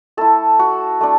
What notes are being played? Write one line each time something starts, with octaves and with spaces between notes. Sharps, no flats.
A3 E4 A4
F#4
A3 D4